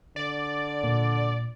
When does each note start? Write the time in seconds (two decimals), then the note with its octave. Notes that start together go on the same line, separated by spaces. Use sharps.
0.16 D3 D5
0.84 A#2